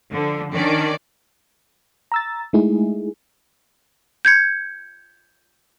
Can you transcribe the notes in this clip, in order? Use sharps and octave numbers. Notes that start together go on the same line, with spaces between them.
D3 F3
D#3 C#4 D4 D5
A#5 E6 A6
G#3 A3 D#4 E4 G#4
G6 G#6 C#7